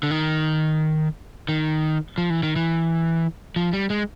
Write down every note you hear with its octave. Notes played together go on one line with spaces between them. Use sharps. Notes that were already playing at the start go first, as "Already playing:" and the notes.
D3
D#3
D#3
F3
E3
D#3
E3
F3
G3
G#3